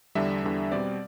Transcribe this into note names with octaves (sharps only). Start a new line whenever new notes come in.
E2 D3 G3 D4 E5
E2 D3 G3 D4
B2 G3 C4 D5